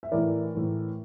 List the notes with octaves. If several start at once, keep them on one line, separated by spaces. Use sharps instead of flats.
E5
A2 E3 A#4 D5
A2 E3